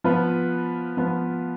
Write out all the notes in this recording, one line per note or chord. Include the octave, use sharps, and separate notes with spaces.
F3 B3 F4 B4
F3 B3 F4 B4